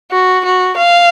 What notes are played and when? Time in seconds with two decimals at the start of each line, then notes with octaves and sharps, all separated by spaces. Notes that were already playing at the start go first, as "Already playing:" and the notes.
0.11 F#4
0.45 F#4
0.77 F5